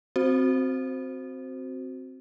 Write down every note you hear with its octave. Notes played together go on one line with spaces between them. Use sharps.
C4 F#4 C5